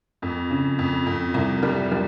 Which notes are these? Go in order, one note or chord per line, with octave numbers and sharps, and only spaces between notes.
F2
C#3
F2
F2
C2
G3
G3